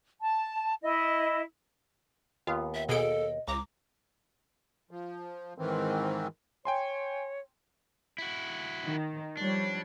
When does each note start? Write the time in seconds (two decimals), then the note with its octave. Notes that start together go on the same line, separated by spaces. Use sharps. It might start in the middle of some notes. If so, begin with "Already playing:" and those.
0.21 A5
0.83 E4 D#5
2.47 D#2 B3 F4 F#5
2.74 E5
2.89 B2 G#4 A4 D#5 D7
3.48 C#2 A#5 D6
4.91 F3
5.58 G#2 D#3 E3 C4
6.65 C#5 G5 G#5 C6
8.18 E4 F#4
8.86 D#3
9.37 F3 G3 D4 C#5